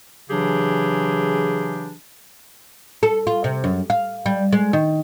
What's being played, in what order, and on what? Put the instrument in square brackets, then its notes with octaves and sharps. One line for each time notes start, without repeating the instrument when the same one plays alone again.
[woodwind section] C#3 E3 F#3 D4 G4 G#4
[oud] A4
F4
C3
F#2
F5
G3
G#3
D#3